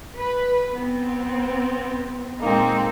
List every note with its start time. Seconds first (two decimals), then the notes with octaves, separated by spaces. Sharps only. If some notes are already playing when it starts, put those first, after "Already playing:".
0.16 B4
0.76 B3 C4
2.41 A#2 G#3 A#3 C4 D#4